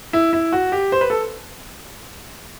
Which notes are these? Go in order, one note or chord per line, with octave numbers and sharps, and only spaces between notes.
E4
E4
F#4
G4
C5
B4
A4